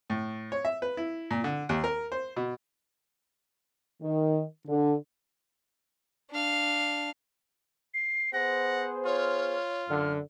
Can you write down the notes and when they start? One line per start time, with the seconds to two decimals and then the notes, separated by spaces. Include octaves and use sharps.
0.10 A2
0.52 C#5
0.65 E5
0.82 B4
0.97 E4
1.31 A#2
1.44 D3
1.69 D#2
1.84 A#4
2.12 C5
2.37 B2
4.02 D#3
4.67 D3
6.31 D4 F5
7.94 C7
8.34 B3 G#4 C5 F#5 A#6
9.06 F4 C#5 F6
9.88 F#2 D3 F6